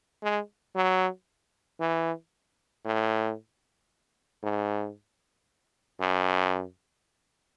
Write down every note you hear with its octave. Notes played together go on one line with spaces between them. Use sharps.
G#3
F#3
E3
A2
G#2
F#2